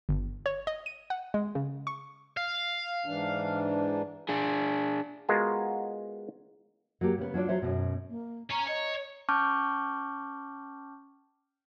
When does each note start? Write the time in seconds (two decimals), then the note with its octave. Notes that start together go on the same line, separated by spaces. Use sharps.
0.09 G1
0.46 C#5
0.67 D#5
0.86 D#7
1.10 F#5
1.34 G#3
1.55 C#3
1.87 C#6
2.37 F5
3.06 G#2 E3 D4
4.29 D4 G#4
5.29 G#3 B3 F4 F#4 G#4 A#4
7.01 F#3 A#3 G4
7.18 C#3 B3
7.34 F#3 D4 F4 D5
7.49 F#3 C5 E5
7.62 F#2 B2
8.09 A#3
8.51 C#4 C#5 A#5
8.68 C#5 D#5
9.29 C#4 A5 C#6 D6 F6 G6